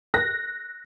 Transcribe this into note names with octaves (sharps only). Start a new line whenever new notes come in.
F#6 A#6